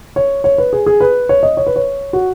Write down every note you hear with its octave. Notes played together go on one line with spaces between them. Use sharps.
C#5
C#5
B4
G#4
G#4
B4
C#5
D#5
C#5
B4
C#5
F#4